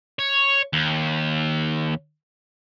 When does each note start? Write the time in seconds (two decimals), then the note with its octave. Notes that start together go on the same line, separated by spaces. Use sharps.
0.19 C#5
0.73 D#2